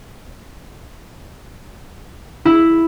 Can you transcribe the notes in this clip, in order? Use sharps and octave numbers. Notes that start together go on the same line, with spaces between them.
E4